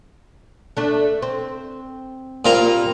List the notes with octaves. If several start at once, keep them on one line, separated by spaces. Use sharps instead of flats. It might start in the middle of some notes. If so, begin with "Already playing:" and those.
A3 D4
C4
A#2 G3 A#3 C4 F4 A#5